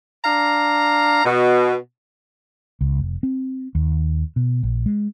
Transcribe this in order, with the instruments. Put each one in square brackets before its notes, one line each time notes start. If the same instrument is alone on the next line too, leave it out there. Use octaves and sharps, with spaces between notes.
[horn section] D4 F5 A#5
B2
[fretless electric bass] C#2
F1
C4
D#2
B2
A#1
G#3